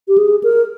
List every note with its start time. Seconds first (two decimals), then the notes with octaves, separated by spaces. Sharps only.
0.08 G4
0.18 G#4
0.44 A#4